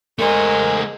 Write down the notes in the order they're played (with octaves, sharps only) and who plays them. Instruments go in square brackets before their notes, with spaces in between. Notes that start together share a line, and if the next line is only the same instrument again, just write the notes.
[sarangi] G#3 [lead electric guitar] A3 C5 [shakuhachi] A#4